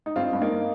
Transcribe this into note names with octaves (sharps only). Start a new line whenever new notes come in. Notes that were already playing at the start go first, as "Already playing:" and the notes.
D#4
G2 C4 F4
G2
A#3 D#4